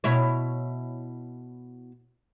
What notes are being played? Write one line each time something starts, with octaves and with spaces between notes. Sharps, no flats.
B2 E4 C#5